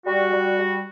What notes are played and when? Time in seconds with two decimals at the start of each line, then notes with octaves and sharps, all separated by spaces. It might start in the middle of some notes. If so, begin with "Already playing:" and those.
0.06 G3 F#4
0.33 G3
0.59 G3